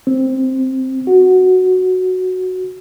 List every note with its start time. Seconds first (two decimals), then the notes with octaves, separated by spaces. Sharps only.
0.07 C4
1.07 F#4